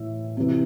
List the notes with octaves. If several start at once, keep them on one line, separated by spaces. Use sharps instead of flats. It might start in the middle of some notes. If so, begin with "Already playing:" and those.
Already playing: A2 E3 E5
C3 E3